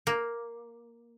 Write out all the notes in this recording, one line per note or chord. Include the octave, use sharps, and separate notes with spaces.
A#3